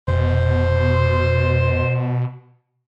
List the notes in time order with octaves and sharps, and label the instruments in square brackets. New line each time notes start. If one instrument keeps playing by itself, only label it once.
[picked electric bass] F1 [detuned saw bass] B2 [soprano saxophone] C5